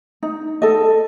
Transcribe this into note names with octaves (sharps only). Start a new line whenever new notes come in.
D#4
A4 D#5